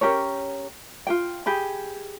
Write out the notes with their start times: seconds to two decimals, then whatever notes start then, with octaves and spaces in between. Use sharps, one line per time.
0.01 C#4 G4 A#4 C#5
1.07 F4 G#4 G5
1.46 G4 G#4 B5